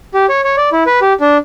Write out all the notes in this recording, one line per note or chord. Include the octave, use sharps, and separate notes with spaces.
G4
C#5
C#5
D5
E4
B4
G4
D4